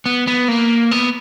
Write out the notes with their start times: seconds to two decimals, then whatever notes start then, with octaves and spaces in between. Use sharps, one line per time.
0.06 B3
0.27 B3
0.48 A#3
0.91 B3